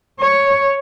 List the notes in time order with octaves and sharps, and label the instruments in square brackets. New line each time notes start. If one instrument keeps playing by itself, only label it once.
[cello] C#5